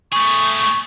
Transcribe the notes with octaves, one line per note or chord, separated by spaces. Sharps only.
A3 G#4 C#6